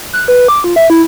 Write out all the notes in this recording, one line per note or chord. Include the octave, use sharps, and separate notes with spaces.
F#6
B4
D6
F4
E5
E4